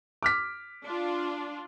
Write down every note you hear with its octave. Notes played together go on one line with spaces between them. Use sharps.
D6 F6 B6
D4 F4